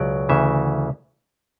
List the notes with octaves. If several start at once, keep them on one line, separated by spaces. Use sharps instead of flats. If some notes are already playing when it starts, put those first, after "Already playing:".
Already playing: C#2 B2 F#3 D5
D2 C#3 E3 E5